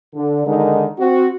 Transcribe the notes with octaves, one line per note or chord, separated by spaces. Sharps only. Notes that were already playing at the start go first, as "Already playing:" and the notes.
D3
D3 D#3 G#3 D#4 A#4
C4 F#4